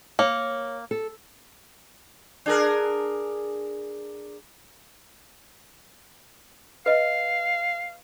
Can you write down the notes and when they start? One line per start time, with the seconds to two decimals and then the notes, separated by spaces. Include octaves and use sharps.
0.19 A#3 C#5
0.91 A4
2.46 D4 G#4 A#4
6.86 B4 D#5 F5